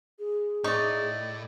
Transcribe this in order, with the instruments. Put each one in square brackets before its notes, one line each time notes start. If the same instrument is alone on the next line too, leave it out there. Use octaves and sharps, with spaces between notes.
[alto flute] G#4
[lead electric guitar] A2 [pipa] D#4 [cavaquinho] D5 C#6